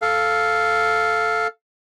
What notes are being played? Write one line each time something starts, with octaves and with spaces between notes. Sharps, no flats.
A4 F5